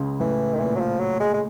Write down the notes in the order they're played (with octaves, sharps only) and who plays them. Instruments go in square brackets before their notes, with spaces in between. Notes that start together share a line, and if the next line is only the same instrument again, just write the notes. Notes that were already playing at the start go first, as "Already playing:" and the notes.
Already playing: [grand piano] C#2 C#3
[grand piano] A2 [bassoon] E3
[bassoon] D#3
[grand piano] A#2 [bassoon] E3
[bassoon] F#3
F3
F#3
G#3
G#3